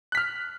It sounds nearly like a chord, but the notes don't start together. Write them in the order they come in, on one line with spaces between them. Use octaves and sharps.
F#6 B6 F6